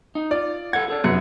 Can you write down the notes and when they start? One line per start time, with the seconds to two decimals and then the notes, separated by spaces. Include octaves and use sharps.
0.15 D#4
0.31 F4 D5
0.73 A4 F5 F#5 G#6
0.88 G#4 A4 D5
1.04 F1 F#2 B3 G#4 C#7